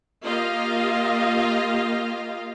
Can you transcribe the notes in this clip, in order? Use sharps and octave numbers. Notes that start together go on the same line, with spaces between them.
A#3 F4 G4 D#5 F5